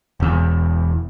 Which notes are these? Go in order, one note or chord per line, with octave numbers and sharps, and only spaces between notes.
E1 E2